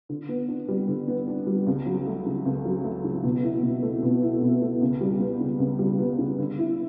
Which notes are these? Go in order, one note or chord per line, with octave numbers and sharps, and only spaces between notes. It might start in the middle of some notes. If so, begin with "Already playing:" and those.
D3
B3
D4
G3
D3
B3
D4
G3
C#2
F#3
A3
C#3
C#2
F#3
A3
C#3
B2
E4
B2
A3
B2
E4
B2
A3
C#2
G3
B3
C#3
C#2
G3
B3
C#3
D3
E4